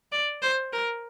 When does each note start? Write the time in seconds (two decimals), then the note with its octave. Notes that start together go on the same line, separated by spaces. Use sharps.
0.12 D5
0.42 C5
0.73 A#4